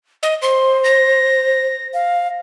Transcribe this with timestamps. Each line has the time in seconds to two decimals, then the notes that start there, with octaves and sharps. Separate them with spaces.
0.23 D#5
0.42 C5 C6
0.84 A#6
1.94 F5